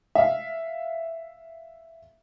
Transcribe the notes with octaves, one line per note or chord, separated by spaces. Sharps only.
E5 F5